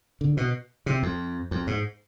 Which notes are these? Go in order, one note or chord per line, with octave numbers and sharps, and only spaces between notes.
D3
B2
C3
F2
F2
G#2